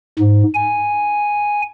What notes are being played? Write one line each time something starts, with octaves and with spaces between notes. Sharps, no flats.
G#2
G#5